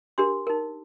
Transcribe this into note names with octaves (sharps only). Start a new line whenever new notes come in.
D4 G4 A#4 C6
D#4 A#4